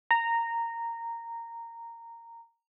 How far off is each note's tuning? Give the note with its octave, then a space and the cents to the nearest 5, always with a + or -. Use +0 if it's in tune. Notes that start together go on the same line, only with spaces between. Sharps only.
A#5 -10